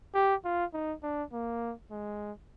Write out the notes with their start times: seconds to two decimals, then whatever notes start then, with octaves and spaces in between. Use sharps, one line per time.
0.14 G4
0.44 F4
0.73 D#4
1.03 D4
1.32 A#3
1.91 G#3